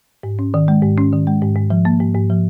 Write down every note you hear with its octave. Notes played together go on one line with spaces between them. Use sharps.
G#2
C#4
D#3
G#3
G#2
C#4
D#3
G#3
G#2
G#2
F3
A#3
G#2
G#2
F3